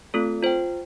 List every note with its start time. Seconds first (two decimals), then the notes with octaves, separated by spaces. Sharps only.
0.14 A3 C4 F4 A4
0.43 F4 C5 G5